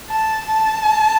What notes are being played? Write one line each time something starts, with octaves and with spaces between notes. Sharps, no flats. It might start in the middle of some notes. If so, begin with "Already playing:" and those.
A5
A5